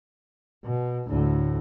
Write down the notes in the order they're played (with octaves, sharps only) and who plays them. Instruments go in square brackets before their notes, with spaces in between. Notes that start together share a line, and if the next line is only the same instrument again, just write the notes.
[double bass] B2
D2 A2